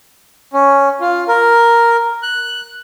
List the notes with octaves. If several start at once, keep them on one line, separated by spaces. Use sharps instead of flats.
C#4
F4
A#4
F#6